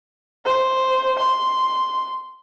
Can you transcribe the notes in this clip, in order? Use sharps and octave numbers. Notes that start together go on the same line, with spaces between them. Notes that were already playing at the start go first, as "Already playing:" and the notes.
C5
C6